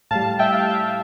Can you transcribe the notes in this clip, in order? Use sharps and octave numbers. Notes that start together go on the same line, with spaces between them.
A2 G3 F5 A5
E5 G5
F5 A5
E5 G5